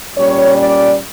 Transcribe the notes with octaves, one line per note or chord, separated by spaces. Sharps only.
A#2 G3 C#4 C#5
D5